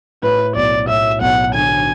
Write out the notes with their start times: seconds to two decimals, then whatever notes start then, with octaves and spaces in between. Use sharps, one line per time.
0.23 A2 B4
0.56 B1 D5
0.88 A2 E5
1.21 B1 F#5
1.54 D3 G#5